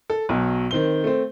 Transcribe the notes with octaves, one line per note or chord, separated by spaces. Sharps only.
A4
B1 B2 F#3
D#3 C4 G7
A3 C4